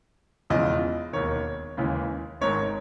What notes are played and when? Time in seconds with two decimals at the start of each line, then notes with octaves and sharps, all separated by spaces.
0.50 E1 E2 C#3 F3 G#3 D#5
1.13 E1 D#2 D#3 C#5
1.77 D#2 C#3 E3 G#3
2.41 G#1 G#2 D#3 C#5